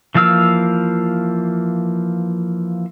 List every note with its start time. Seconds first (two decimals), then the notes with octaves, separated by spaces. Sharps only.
0.15 E3 F3 A#3 F5 E6